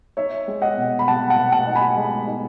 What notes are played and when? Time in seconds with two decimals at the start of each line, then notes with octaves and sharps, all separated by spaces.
0.17 D#4 C#5 E5
0.48 G#3
0.62 D#5 F#5
0.77 B2
0.99 B5
1.07 B2 F#5 A5
1.30 F#5 A5
1.38 B2
1.52 F#5 A5
1.67 D#4
1.75 G#5 B5
1.97 G#3
2.27 D#4